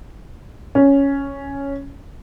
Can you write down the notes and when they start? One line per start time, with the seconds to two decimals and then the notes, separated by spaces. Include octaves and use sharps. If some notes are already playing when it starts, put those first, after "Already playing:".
0.75 C#4